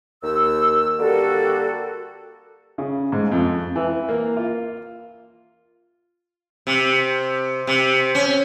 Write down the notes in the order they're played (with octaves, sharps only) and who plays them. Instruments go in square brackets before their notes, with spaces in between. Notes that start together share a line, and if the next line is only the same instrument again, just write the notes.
[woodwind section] D#2 E6
D3 G3 A#3 F#4 G4 A4
[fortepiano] C#3
G#2
F2
E3
A#3
F4
[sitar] C3
C3
C#4